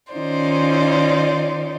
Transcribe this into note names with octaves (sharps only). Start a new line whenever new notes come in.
D#3 C#4 D#4 F4 C5 D5